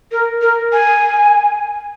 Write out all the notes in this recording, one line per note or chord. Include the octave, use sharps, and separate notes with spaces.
A#4
A#4
G#5